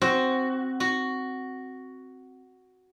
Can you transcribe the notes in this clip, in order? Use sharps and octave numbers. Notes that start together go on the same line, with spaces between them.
C4 F#4
F#4